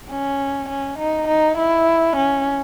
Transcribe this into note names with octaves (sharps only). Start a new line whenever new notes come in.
C#4
C#4
D#4
D#4
E4
C#4